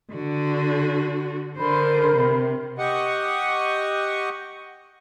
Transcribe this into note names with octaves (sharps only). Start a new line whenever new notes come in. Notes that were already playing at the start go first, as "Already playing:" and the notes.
D3 F#4
D3 A#4 C5 B5 C6
C3
G4 D#5 F#5 C#6